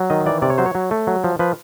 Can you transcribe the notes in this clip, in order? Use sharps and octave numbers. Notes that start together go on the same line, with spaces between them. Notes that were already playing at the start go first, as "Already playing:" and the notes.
Already playing: F#3
D#3 D#5
E3 D5
C3 D5
C#5
F#3 C5
C#5
F#3
A3
F#3
F3
F3 B4